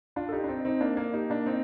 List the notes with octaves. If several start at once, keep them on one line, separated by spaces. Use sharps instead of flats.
D4 F4
A4
D#4 G4
D4
C4 D#4
C4 D#4
A#3 D4
A#3
D#4 G4
A#3 D4
C4 D#4